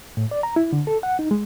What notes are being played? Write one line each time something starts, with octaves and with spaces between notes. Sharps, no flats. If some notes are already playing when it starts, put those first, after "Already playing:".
A2
D5
A#5
E4
D3
A4
F#5
D#4
G#3